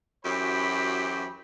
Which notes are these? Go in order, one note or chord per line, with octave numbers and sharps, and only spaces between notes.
F#2 E3 F#4 G4 C5 B5